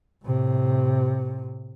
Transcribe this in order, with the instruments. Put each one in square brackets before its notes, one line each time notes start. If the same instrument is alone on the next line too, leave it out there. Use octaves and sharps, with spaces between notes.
[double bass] A2 C3